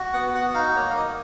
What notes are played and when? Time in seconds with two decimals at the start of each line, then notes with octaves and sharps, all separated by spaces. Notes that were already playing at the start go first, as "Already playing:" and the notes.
Already playing: F#4
0.14 B3 F#5
0.34 F#4 F#5
0.54 D#4 F5
0.76 A#3 C#5
0.90 F5
0.96 A#3 D#5